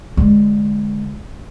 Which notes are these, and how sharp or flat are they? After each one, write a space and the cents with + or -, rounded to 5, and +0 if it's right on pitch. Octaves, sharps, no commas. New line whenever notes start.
D3 +0 G#3 +0